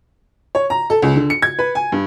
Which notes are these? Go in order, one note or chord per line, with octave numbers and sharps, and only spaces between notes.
C#5
A#5
A4
C#2
D3
C#7
G#6
B4
G#5
G2